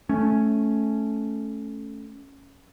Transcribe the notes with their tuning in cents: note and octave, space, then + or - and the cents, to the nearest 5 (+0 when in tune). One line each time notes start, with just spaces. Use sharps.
A3 -10 C#4 +0